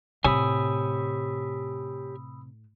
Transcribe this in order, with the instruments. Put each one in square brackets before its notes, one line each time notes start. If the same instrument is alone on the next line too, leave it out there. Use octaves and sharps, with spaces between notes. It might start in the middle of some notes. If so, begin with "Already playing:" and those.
[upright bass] A2 [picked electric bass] C3 [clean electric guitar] G4 C#5 G#5 [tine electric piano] B5 D#6 E6